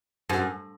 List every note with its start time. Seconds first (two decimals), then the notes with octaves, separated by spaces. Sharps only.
0.30 F#2